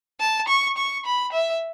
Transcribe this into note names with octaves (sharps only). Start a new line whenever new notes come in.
A5
C#6
C#6
B5
E5